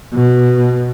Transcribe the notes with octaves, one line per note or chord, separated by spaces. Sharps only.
B2